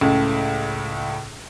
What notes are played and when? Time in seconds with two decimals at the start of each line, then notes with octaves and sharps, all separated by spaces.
0.01 C#2 A2 C#3